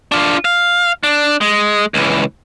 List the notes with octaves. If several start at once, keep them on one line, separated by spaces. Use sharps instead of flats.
D4 F4
F5
D4
G#3
C#2 E3